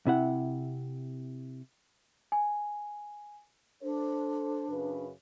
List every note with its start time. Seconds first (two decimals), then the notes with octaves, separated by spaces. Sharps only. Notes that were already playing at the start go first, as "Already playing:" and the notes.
0.07 C3 E4 F#5
2.32 G#5
3.83 D4 A4 C5
4.69 F#2 C#3 B4